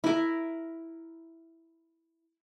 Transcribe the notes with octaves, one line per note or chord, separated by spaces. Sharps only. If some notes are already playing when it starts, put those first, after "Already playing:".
E4 A#4